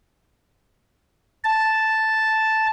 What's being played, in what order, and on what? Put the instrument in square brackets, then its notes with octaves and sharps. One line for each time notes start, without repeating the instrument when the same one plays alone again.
[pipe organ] A5